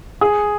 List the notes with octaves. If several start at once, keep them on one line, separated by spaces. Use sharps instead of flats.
G#4